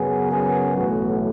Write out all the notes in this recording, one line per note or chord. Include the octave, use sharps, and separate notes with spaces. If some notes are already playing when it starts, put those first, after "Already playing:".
Already playing: F#2 C#3 F#3 B3 G#4
G#4
B1 A2 E3 B3 F#4